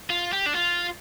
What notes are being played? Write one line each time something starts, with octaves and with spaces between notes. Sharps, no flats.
F4
G4
D4
F4